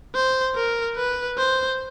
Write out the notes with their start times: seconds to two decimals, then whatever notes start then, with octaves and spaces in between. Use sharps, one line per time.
0.15 C5
0.56 A#4
0.97 B4
1.38 C5